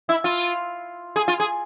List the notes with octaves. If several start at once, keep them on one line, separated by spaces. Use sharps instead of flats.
E4
F4
G#4
F4
G#4